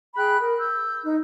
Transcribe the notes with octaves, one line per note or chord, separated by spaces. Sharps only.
G#4 G5 B5 F#6
A#4
E6 G6
D#4